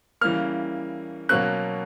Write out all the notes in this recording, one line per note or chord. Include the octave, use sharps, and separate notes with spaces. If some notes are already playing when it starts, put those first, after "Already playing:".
C#3 E3 G3 A#3 F6
B2 F#3 A#3 C#4 F#6